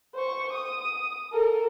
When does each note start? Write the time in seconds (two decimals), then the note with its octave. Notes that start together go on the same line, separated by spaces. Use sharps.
0.15 C5 C#6
0.52 D#6
1.32 A4 A#4